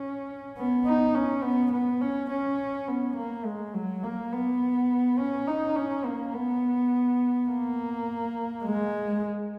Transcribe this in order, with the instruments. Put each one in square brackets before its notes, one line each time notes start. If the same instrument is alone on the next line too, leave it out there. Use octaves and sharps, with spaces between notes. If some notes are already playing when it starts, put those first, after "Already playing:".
Already playing: [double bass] C#4
B3
D#4
C#4
B3
B3
C#4
C#4
B3
A#3
G#3
F#3
A#3
B3
C#4
D#4
C#4
A#3
B3
A#3
G#3